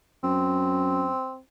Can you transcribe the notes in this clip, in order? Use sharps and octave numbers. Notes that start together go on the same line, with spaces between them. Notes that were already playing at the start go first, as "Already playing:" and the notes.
F#2 C4